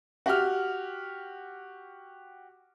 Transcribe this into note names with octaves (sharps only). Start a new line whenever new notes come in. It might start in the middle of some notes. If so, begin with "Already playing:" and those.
F#4 G4 F6